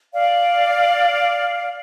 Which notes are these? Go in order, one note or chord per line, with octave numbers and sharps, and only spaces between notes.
D5 F5